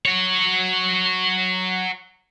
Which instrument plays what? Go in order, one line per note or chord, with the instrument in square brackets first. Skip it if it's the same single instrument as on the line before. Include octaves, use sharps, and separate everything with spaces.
[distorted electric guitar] F#4 C#5